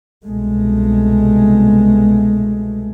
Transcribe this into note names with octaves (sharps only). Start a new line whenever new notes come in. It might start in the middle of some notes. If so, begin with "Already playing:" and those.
C2 B2 G#3 A3